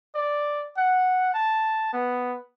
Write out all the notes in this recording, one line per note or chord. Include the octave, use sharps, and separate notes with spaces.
D5
F#5
A5
B3